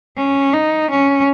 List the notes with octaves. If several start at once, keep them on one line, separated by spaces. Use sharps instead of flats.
C#4
D#4
C#4